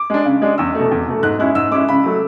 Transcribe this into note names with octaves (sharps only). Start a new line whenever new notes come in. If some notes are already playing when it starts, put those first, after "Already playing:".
Already playing: D6
G#3 D4
C#3
G#3 D4
E2 E6
B2 A3
E2
B2 A3
G#2 F#6
G#3 C#4 E4 F#6
G#2 E6
G#3 C#4 E4 D6
C#3 B5
F#3 A3